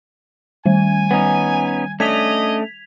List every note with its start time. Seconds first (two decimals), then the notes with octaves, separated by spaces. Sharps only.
0.66 D#3 G3 G#5
1.11 B3 C#4 D#4
2.00 A3 C#4 D4 D#5 G#6 B6 F7